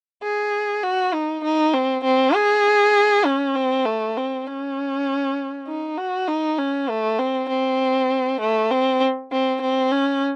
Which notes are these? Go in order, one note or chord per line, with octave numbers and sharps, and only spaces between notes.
G#4
F#4
D#4
D#4
C4
C4
G#4
C#4
C4
A3
C4
C#4
D#4
F#4
D#4
C#4
A3
C4
C4
A3
C4
C4
C4
C#4